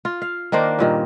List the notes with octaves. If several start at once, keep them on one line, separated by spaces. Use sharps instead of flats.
F4
F5
D#3 A#3 D4 C5
G2 A#2 D#3